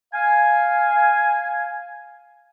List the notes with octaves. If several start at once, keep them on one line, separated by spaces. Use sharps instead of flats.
F5 G#5